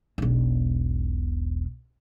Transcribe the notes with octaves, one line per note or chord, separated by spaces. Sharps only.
E1 B1